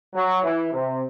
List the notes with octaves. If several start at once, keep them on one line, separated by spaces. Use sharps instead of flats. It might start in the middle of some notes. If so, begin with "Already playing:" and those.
F#3
E3
C3